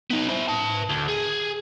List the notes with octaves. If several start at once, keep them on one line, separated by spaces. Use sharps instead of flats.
B3 D#4
E4 C5
B4 A5
D2
G#4